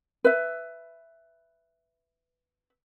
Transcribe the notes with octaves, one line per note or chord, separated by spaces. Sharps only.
B4 E5